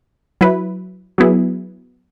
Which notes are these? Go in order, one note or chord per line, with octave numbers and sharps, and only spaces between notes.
F#3 E4 B4
F#3 B3 E4 G#4